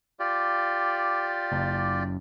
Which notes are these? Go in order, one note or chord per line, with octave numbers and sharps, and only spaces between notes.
F4 G4 D5
F#1